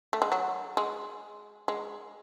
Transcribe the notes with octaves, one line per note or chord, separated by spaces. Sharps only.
A3
G#3
F#3
G#3
G#3